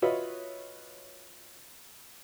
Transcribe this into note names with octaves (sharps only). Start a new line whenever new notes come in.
F4 F#4 B4 C#5 D#5 E5